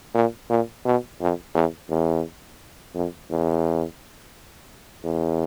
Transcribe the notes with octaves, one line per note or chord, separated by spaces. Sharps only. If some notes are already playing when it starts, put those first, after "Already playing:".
A#2
A#2
B2
F2
E2
E2
F2
E2
E2